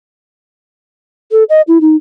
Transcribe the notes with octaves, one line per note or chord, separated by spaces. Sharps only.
A4
D#5
E4
D#4